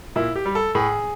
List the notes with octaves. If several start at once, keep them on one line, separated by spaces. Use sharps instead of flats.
A#2 E4
G4
G3
A4
A2 G#4